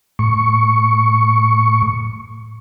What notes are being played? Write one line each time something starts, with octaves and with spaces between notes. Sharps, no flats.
A2 C#6